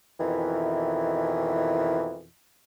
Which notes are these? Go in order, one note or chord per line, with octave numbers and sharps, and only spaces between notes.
F2 B2 D#3 E3